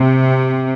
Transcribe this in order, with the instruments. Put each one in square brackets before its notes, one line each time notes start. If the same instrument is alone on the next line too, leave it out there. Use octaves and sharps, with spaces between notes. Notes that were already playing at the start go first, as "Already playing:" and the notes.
Already playing: [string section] C3